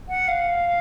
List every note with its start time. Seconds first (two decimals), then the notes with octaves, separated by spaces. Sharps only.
0.09 F#5
0.28 F5